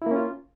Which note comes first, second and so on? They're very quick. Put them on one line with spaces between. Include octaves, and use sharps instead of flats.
E4 A#3 C#4 F4